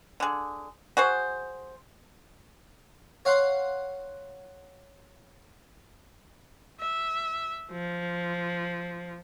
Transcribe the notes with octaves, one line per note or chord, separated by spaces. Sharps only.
D3 G#4
F#4 G#4 C5
C#5 F5 F#5 C6
E5
F3